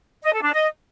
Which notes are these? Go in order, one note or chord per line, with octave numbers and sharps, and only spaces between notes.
D#5
A4
D4
D#5